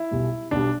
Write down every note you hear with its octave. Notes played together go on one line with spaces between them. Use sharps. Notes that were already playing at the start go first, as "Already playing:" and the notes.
Already playing: E4
B1 B2 G3
B1 B2 G3 D4